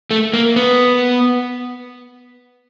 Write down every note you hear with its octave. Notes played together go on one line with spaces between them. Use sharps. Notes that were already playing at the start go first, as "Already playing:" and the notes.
A3
A#3
B3